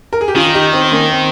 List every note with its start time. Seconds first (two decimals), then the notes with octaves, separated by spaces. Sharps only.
0.13 A#4
0.21 G#4
0.28 G4
0.35 D#3 C#4 F4
0.54 D#4 G4
0.72 C4 D#4
0.84 C4
0.92 A#3 C#4
1.11 C4